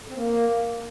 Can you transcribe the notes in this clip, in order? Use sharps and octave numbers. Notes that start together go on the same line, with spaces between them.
D3
C4
A#3